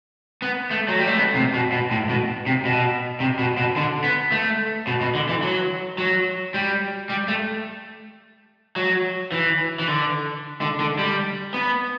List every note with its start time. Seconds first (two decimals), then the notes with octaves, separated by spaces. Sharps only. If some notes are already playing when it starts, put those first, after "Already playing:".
0.42 B3
0.71 A3
0.89 F#3
0.98 G3
1.07 A3
1.16 B3
1.35 C3
1.54 B2
1.72 B2
1.91 A2
2.09 B2
2.46 C3
2.65 B2
3.20 C3
3.39 B2
3.57 B2
3.76 D3
4.04 B3
4.32 A3
4.87 B2
5.01 B2
5.15 D3
5.29 E3
5.42 F#3
5.98 F#3
6.54 G3
7.10 G3
7.28 A3
8.76 F#3
9.32 E3
9.79 E3
9.88 D3
10.61 D3
10.80 D3
10.99 G3
11.54 B3